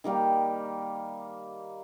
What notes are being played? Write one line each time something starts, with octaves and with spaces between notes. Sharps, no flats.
D#3 G3 A#3 G4